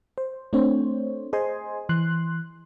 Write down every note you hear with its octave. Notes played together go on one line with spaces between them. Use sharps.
C5
A3 C4 D4 C5 C#5
G#4 C5 D#5 G#5 C6
E3 C6 F#6